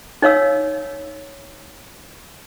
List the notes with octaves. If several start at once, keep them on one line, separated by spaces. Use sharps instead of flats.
D#4 C#5 F5 E6